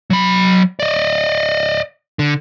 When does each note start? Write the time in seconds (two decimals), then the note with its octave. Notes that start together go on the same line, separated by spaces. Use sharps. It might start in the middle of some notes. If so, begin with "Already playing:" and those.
0.10 F#3 B5
0.80 D5 D#5
2.19 D3